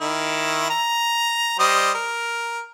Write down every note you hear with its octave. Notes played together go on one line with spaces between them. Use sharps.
D#3 E4
A#5
G3 C5 D#5
A#4